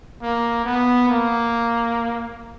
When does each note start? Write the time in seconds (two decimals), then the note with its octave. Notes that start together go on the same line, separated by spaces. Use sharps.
0.22 A#3
0.65 B3
1.08 A#3